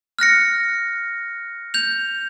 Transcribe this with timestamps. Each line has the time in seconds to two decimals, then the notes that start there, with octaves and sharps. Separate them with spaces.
0.19 F6 F#6 A#6 C#7
1.74 G6 F7